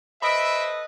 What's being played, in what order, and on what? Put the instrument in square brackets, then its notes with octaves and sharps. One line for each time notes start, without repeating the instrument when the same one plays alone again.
[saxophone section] A4 B4 D#5 [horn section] C5 E5 [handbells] B5 B6 D7